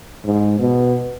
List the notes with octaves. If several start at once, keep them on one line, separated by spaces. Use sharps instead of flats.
G#2
B2